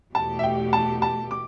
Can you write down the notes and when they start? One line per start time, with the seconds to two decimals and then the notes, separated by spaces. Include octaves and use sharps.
0.15 E2 B2 A3 G4 A5
0.39 E5
0.43 G5
0.73 A5
1.02 A5
1.31 D6